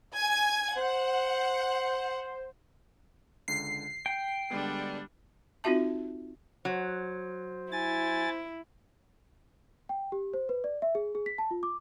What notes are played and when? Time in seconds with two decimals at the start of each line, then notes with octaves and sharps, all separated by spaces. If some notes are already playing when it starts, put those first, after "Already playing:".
0.16 G#5 G#6
0.76 C5 F#5
3.48 C#2 D3 C7
4.06 G5 C#7
4.50 D3 G3 G#3 B3 D4
5.64 C4 D#4 F4 F#4 E5 A5
6.65 F#3 C5
7.72 E4 G#5 A6
9.89 G5
10.12 G4
10.34 C5
10.49 B4
10.64 D5
10.82 E5
10.95 G#4
11.15 G#4
11.26 B6
11.38 A5
11.51 F4
11.63 D6